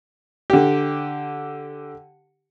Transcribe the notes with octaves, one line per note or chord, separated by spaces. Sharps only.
D3 G4